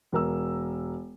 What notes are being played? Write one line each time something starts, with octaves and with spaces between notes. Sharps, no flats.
E1 A#4 E6